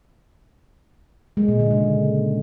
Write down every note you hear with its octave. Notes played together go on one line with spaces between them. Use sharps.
G#3
A#2
D3
C#3